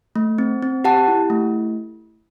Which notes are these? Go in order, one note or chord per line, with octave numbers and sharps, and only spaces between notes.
A3
C4
C4
G4 F#5 A5
E4
A3